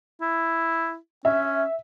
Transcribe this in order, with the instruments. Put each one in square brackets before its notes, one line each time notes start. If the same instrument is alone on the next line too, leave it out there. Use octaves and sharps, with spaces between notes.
[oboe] E4
[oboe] C#4 [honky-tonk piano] E5